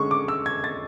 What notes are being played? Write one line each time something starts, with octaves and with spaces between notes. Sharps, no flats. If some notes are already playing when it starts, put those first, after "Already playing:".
Already playing: D3 G#3 C#4 C#6
D6
E6
G#6
A6